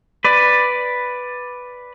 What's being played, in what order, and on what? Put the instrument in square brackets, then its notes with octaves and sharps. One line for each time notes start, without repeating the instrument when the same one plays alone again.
[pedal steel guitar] B4 D5